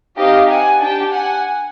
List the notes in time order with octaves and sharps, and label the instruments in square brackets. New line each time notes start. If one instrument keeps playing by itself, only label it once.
[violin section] C4 D#4 G4 D#5 F5
F#5 G#5
D4 G4 G5 A5
F#5 G#5